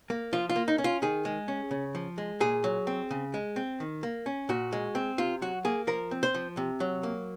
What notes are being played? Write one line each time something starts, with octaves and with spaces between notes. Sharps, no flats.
A#3
F3 F4
F4
A#3
D#4
C#4
F4
D#3 G#4
G#3
C#4
C#3
F3
G#3
A#2 G#4
F#3
C4
C#3
G#3
C4
D#3
A#3
C#4
A#2 F#4
G#3
C4
C3 F4
F#3 F#4
A#3 G#4
F3 A#4
C4
C5
F3
C3
F#3
A#3